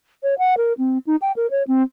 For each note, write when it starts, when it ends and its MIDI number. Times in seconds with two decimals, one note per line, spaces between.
0.23 0.35 73
0.39 0.57 78
0.57 0.73 70
0.78 0.98 60
1.07 1.16 63
1.22 1.32 79
1.36 1.47 70
1.51 1.63 73
1.68 1.82 60